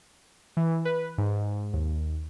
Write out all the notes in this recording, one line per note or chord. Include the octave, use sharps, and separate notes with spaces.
E3
B4
G#2
D#2